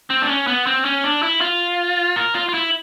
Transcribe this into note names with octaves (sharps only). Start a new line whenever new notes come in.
C4
D4
C#4
B3
C4
C#4
D4
E4
F4
A#4
F4
F4
E4